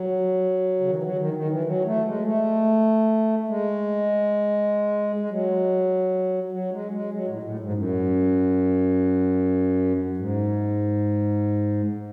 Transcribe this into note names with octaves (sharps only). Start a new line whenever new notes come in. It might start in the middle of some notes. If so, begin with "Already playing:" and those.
Already playing: F#3
C#3
D#3
E3
F#3
D#3
D#3
E3
F#3
A3
G#3
A3
G#3
G#3
F#3
F#3
G#3
G#3
F#3
A2
A2
G#2
F#2
G#2